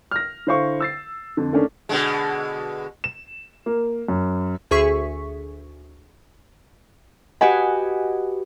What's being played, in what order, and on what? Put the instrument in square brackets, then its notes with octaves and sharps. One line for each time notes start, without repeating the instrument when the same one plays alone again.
[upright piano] F6 A#6
D3 E4 C5 F5 C#6
E6 A6 C7
F2 D3
D#3 A3 A#3 C#4 D4
[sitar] B2 D3 G#3
[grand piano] E7
A#3
F#2
[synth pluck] D2 G#4 E5 C#6 B6
[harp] F#4 G4 B4 [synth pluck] D#5 F#5 G#5